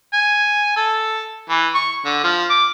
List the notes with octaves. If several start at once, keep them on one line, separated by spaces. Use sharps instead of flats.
G#5
A4
E3
C#6
D3
F3
D6